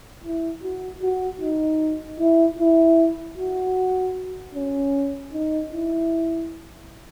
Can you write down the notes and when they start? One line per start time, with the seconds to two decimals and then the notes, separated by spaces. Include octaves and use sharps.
0.24 E4
0.63 F#4
1.02 F#4
1.41 D#4
2.20 E4
2.59 E4
3.37 F#4
4.55 C#4
5.33 D#4
5.73 E4